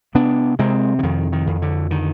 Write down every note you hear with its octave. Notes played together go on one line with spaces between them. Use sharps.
C3 B3 D4
C3 G#3 C4
D3
F2 D#3
D#3
F2
D3
D3 D#3